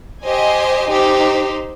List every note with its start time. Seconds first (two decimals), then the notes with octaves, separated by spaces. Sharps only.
0.23 G4 C5 D#5 G#5
0.87 D#4 G4 C5